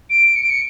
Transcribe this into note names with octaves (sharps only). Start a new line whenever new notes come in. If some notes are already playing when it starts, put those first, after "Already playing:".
D7
C#7
D7
C#7